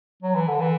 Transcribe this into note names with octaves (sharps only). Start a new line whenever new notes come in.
F#3
E3
D3
E3